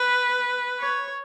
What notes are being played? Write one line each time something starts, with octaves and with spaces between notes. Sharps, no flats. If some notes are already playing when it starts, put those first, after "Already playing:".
Already playing: B4
C#5